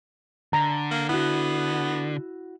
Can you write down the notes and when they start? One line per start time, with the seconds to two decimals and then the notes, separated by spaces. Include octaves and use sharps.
0.53 D3 A#5
0.91 A#3
1.09 B3 E4 F#4